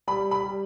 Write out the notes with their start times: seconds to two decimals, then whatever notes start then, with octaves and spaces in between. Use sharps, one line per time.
0.08 G3 B5
0.31 B5
0.43 G3